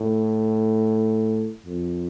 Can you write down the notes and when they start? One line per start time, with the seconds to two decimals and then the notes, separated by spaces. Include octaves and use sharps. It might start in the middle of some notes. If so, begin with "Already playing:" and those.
Already playing: A2
1.66 F2